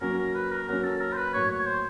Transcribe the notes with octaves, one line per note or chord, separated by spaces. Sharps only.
F#3 A#3 C#4 A#4
A#4
B4
A#4
F#3 A#3 C#4 A#4
A4
A#4
C5
B4
A2 F#3 A#3 C#5
C#5
C5